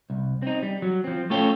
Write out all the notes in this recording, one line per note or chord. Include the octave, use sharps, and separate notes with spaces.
C2
C4 D#4
G3
F#3
F3 C4
A3 C#4 F4 A4 C#5 G5